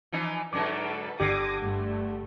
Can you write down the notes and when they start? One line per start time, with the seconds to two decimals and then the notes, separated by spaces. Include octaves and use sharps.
0.12 E3 F3 D#4
0.53 G#2 D3 F#3 A4 B4 D6
1.20 G1 D3 G4 D6 D#6 A#6
1.60 G2 A3